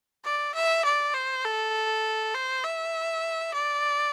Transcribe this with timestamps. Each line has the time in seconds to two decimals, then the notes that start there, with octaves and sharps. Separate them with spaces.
0.25 D5
0.55 E5
0.85 D5
1.14 C5
1.45 A4
2.35 C5
2.64 E5
3.54 D5